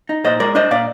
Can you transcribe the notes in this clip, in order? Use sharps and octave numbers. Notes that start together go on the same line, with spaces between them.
D#4
A#2 C5 D#5
G#3 A#4 D5
D4 C5 D#5
A#2 D5 F5